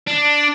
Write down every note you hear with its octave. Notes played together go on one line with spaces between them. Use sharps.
D4